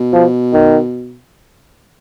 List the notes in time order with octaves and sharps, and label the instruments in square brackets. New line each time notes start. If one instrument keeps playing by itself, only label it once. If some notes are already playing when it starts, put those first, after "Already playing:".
Already playing: [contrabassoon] B2
[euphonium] F3
D#3